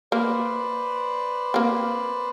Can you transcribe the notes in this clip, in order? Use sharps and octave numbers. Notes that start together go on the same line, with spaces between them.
A#3 B4 C5 D5
A#3 C4